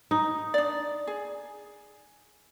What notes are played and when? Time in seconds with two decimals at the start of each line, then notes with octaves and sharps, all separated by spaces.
0.11 D#4
0.54 D4 D5
1.07 G#4